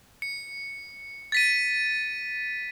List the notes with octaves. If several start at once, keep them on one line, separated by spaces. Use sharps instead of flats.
C#7
A6 B6 D#7